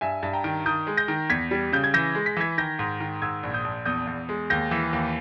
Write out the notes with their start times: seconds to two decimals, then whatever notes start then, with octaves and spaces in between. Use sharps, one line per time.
0.01 G2 E5 G#5
0.23 G2
0.33 G5 A#5
0.44 D#3
0.66 D#3 D#6 G6
0.87 G#3
0.97 G6 A#6
1.08 D#3
1.30 E2 G#6 B6
1.51 G3
1.73 C#3 G6
1.84 G#6
1.94 E3 G6 A#6
2.15 G#3
2.26 B6
2.37 E3 G#6 B6
2.58 D#3 G6 A#6
2.79 G#2
3.00 D#3
3.22 G#2 E6 G#6
3.43 A#1
3.54 D#6 G6
3.64 A#1
3.85 E2 D#6 G6
4.07 E2
4.29 G#3
4.50 D#2 G6 A#6
4.71 E3
4.93 D#2